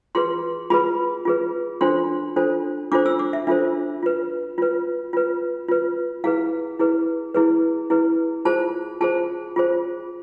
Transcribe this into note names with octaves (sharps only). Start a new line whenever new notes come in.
F4 G#4 B4 C6
F4 G#4 B4 B5
F4 G#4 B4
D4 F4 A4 C5 C6
D4 F4 A4 C5
D4 F4 A4 C5 D6
E6
D6
E5
D4 F4 A4 C5 E5
F4 B4
F4 B4
F4 B4
F4 B4
E4 G#4 B4 F5
E4 G#4 B4
E4 G#4 B4
E4 G#4 B4
F4 G#4 C5 A5
F4 G#4 C5 A5
F4 G#4 C5